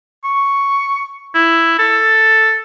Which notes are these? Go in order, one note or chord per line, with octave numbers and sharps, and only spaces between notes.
C#6
E4
A4